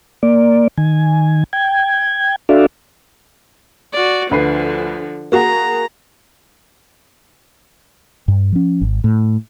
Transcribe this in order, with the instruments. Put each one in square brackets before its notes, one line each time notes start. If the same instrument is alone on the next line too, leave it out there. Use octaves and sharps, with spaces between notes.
[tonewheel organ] A#3 D5
D#3 G#5
G5 G#6
D4 F#4 A4 D5 E5 F5
[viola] F#4 D5
[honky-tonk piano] D2 B4 C7 [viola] D3 F3
[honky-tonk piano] A#3 F#4 G#4 [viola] A#5
[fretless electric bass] G2
F3 C#4
G#1
A2